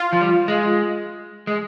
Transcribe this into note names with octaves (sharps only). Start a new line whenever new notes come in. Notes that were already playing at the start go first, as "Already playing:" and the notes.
Already playing: F4
F3
G3
G#3
G#3